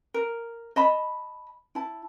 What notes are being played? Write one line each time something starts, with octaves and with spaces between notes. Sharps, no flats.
A#4
D#5 A5 B5
E4 A5